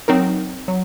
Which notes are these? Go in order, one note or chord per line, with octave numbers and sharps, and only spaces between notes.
F#3 C4 D#4 A#4
F#3